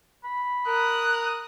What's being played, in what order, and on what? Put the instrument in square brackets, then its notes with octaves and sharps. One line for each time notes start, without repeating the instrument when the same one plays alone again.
[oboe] B5
[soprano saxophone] A#4 [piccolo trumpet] D#6 [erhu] F#6